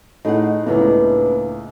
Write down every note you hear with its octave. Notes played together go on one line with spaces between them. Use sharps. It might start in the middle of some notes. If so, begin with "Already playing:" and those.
A2 D#4 G#4 F#5
C#2 A2 A#3 B3 D4